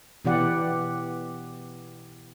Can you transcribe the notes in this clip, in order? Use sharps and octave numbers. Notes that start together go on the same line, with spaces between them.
B2 E3 B3 G4 D5 F#5